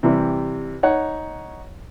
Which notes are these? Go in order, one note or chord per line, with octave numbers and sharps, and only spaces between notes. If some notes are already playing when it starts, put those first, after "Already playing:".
C3 E3 G3
D#4 C#5 F#5